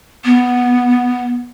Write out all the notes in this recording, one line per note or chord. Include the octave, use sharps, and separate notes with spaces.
B3